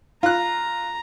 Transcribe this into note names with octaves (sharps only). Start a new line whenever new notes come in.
F4 A#5 F#6